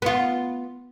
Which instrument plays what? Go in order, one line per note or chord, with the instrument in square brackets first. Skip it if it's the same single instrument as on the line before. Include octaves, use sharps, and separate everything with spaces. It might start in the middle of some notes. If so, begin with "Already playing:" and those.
[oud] B3 F4